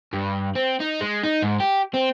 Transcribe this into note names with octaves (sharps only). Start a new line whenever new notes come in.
G2
C4
D#4
G#3
D#4
G#2
G4
C4